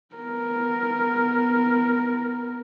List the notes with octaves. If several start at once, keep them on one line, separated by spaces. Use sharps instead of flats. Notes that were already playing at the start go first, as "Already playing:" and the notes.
B3 A#4